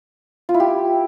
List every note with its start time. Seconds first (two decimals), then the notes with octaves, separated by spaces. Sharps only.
0.49 F4
0.54 E4
0.60 G4